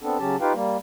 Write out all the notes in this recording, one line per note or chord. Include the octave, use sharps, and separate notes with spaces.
B3 C4 D4 A4
C#3 F#3 C#4 G4 A5
D#4 F4 G4 B4 F5 G5
G3 A#3